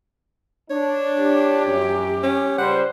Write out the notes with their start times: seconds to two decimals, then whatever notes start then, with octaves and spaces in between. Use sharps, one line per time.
0.71 D4 C#5
1.21 G4
1.65 F#2
2.23 C#4
2.58 C#2 G3 C5 F#5